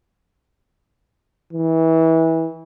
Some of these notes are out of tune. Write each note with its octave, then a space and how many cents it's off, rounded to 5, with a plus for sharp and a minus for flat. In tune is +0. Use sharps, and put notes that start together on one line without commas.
E3 -25